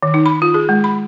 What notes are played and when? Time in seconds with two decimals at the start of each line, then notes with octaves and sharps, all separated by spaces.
0.03 D#3
0.14 D#4
0.26 B5
0.42 F4
0.54 G#4
0.69 G#3
0.84 B5